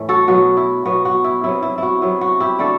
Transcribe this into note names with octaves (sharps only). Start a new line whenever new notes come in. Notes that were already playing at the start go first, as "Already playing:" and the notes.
Already playing: A2 E3 A3
F#4 A4
B2 F#3 B3 F#4
E4
B2 F#3 B3 F#4
F#4
E4
C3 F#3 B3 E4
E4
E4 F#4
C3 F#3 B3 E4
F#4
E4 G4
D3 A3 D4 F#4 A4